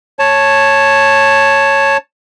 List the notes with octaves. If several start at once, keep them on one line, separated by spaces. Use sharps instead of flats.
C#5 A5